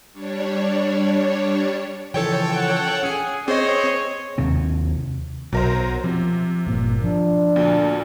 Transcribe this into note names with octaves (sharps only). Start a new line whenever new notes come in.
G3 D4 C#5
C#3 E3 F3 A4 C#5 G5
F#5
C#4 G#4 G#5
C4 G#4 C5 C#5 D#5
D#2 C3 C4
B1 F#3 A#4 C5
C3 F3
G1 A#2
F3 D4
D2 A#2